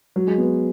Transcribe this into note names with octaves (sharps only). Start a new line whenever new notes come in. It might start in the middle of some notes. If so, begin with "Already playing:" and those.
F#3
G#3
B3